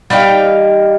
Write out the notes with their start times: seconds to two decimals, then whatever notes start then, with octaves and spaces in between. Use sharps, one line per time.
0.10 G3 D#4 F5 G5